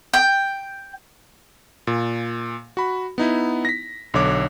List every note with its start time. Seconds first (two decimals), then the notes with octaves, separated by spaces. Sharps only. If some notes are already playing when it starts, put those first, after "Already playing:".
0.14 G5
1.87 A#2
2.77 F#4 B5
3.18 B3 D#4 E4
3.65 A#6 B6
4.14 B1 D3 C#5 D6